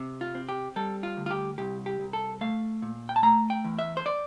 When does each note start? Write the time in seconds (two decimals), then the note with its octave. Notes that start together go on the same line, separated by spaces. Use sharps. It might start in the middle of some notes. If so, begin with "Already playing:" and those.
Already playing: C3
0.21 F4
0.35 C4
0.49 G4
0.76 G3 A4
1.03 F4
1.17 D2
1.26 F4
1.31 G4
1.58 C2 G4
1.86 G4
2.00 C2
2.13 A4
2.41 A3 F5
2.82 A#2
3.09 G5
3.16 A5
3.23 A3 A#5
3.50 G5
3.64 E2
3.79 E5
3.97 C5
4.06 D5